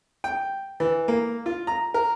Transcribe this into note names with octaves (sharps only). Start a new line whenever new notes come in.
G5
E3
A#3
F4
A#5
A#4